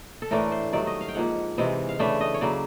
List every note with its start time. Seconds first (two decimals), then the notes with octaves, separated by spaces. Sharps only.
0.22 A4
0.31 A2 E3 A3 D4 A#4
0.52 C5
0.72 G2 D#3 F#3 A3 D5
0.87 D#5
1.01 F5
1.08 G5
1.15 G#2 F3 A#3 F#5
1.57 C3 E3 G#3 C4
1.89 F5
1.99 C#3 E3 A3 D4 E5
2.21 D#5
2.34 C#5
2.41 C#3 F#3 A#3 D5